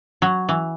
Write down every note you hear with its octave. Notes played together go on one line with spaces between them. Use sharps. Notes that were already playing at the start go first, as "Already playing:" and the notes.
F#3
E3